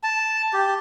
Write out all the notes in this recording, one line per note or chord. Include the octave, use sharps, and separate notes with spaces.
A5
G4